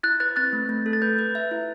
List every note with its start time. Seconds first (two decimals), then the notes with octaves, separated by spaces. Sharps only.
0.03 E4 F#6 A6
0.20 B4 F#6 A6
0.36 C4 F#6 A6
0.53 A3
0.69 A3
0.86 A4
0.93 A6
1.02 B4 G6
1.19 B4
1.35 E5
1.51 E4